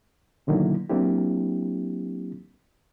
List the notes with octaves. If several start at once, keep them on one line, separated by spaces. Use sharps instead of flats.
B2 D3 D#3 F#3 A#3 E4
F#3 A#3 C4 D4 E4 G4